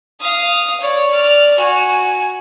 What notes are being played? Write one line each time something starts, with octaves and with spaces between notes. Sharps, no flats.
F5 D#6
C#5 D5
D5 F6
F#4 G#5